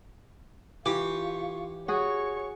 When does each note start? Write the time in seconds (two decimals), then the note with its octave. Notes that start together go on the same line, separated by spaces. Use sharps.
0.86 E3 F4 G4 C#6
1.88 F#4 G#4 C#5 C#6